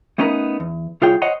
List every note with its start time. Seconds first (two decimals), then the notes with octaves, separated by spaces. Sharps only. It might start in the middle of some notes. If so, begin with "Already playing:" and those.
0.18 A3 B3 C#4 D#4 A#4 B4
0.60 E2
1.02 C2 F4 G#4 C#5 G5
1.22 C5 C#5 D#5 F#5